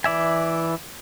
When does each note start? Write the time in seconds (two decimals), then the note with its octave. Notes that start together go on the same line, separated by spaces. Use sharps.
0.04 E3 D5 E5 G#5